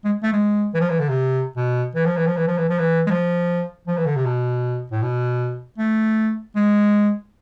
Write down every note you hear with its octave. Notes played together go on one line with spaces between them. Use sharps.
G#3
A3
G#3
E3
F3
E3
D3
C3
B2
E3
F3
E3
F3
E3
F3
E3
F3
E3
G#3
F3
F3
E3
D3
C3
B2
A2
B2
A3
G#3